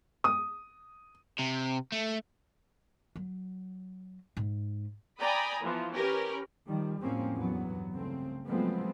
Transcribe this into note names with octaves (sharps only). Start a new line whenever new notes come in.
D#6
C3
A3
F#3
G#2
D5 G5 G#5 A#5 B5 D#6
E3 F3 B3
C#4 G4 A#4 B4
D#3 F3 G3
F2 A2 F3 A#3 C4 C#4
E2 G2 F#3 B3
C2 C#3 A3 C4
F3 F#3 G#3 A3 B3 C4